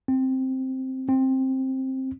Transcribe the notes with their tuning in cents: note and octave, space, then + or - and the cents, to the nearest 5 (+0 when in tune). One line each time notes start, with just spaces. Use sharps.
C4 +0
C4 +10